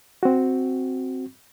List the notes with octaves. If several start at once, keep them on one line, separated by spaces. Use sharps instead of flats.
C4 F#4